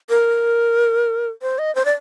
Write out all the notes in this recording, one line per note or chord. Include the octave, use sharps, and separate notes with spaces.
A#4
C5
D#5
C5
D5